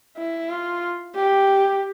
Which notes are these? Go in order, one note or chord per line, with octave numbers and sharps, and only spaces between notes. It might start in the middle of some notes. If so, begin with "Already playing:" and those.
E4
F4
G4